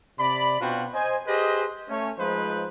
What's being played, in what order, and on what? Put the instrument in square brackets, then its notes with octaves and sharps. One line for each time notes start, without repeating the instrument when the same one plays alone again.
[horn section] C3 D5 B5
B2 C4 D4 F4 F#4 G5
C5 D#5 G#5
G4 G#4 B4 C5 D#5
A3 C#4 C#5
F3 G#3 D#4 F4 B4 C5